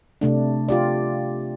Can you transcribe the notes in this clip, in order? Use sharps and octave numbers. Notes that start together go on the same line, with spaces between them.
C3 A3 D4
F4 G4 D5